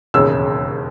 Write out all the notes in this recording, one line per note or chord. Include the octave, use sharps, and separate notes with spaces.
E1 D#2 C#3 E6